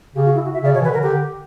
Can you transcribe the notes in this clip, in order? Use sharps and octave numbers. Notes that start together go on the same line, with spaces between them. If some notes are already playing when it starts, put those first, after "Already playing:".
C#3 G4
F#4
E4
F#4
E5
C#3 D5
B2 C#5
E3
B4
D3
A#4
D3 G4